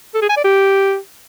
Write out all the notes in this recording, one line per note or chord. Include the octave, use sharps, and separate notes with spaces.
A4
G#4
G#5
D5
G4